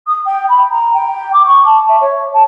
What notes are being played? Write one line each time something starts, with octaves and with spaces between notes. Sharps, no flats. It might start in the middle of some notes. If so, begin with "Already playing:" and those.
D#6
G5
B5
A#5
G5
D6
C#6
A5
E5
C#5
A5